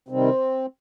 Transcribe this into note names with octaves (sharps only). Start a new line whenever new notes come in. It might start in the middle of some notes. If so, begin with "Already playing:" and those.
C3 D#3 G3 C4